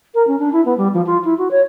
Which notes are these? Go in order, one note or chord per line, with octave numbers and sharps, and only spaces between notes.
A#4
C#4
D4
E4
B3
G3
F3
F4
E4
F#4
C#5